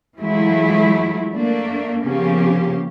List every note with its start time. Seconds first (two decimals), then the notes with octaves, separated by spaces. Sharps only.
0.17 E3 F#3 G#3 A3 E4 F4
1.33 A3 A#3 D4
2.04 C#3 F3 A#3 B3 C#4 G4